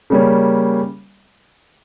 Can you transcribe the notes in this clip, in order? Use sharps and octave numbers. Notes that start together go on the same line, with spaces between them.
C#3 G3 A#3 C#4